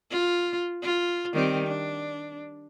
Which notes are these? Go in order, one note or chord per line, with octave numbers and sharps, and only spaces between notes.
F4
F4
D#3 G3 C4
D4